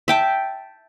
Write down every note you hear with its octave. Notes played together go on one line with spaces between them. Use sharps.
E5 G5 A5